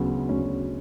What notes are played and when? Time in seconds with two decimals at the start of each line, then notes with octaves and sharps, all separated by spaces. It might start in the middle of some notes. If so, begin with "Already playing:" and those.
Already playing: D2 C#3 F#3 B3
0.29 D2 C#4